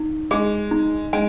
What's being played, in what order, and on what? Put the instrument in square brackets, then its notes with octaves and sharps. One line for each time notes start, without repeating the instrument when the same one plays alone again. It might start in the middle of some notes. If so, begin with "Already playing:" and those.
Already playing: [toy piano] D#4
[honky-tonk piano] G#3 [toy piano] G#4
[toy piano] D#4
[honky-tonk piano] G#3 [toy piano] G#5